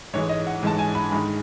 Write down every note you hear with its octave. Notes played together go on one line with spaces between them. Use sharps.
G#2 E3 G#3 C#5
D#5
F#5
G#2 E3 G#3 A5
G#5
B5
G#2 D#3 G#3 B5